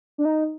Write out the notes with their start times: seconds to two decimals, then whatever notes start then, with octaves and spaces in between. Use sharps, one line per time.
0.18 D4
0.25 D#4